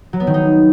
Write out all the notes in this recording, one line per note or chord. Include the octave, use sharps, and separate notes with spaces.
F#3
B3
D#3
D#4